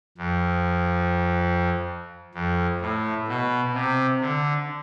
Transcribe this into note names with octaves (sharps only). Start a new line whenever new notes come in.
F2
F2
A2
B2
C3
D3